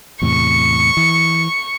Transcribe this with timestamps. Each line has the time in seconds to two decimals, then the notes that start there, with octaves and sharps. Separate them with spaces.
0.22 E2 A2 C3 C#6
0.97 E3